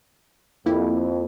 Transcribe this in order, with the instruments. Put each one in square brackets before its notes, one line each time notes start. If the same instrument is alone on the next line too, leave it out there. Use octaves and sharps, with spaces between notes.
[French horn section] F2 [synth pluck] A#3 E4 G4